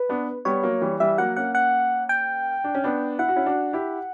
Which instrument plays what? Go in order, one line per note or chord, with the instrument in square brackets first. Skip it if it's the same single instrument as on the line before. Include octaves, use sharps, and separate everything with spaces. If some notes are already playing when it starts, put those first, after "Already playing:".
Already playing: [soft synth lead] B4
[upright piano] B3 D4
[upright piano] G3 B3 [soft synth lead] C#5
[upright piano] F#3 A#3
E3 G3
[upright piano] E3 G3 [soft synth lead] E5
[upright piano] F#3 A#3 [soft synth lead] F#5
[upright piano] A#3 C#4 [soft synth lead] F#5
[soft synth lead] F#5
G5
[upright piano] D4
C#4
B3 D4
[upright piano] E4 [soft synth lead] F#5
[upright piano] F#4
C#4 E4
D4 F#4
E4 G4